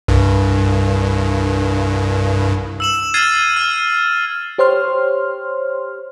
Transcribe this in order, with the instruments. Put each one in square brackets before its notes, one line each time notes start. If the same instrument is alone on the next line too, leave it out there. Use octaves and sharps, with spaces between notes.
[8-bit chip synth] C2 G2
[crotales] E6 E7 F#7
F6 G#6 A6 C7 D#7
F6
[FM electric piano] G4 C5 C#5 C6 F6